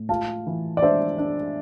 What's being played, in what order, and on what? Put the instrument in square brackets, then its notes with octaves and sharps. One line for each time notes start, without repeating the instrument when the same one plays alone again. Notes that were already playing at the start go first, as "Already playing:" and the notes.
Already playing: [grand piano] A2
[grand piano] F4 [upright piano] F5 A5
[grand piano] E3
[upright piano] D5
[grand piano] D4 [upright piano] C5 E5
[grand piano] D4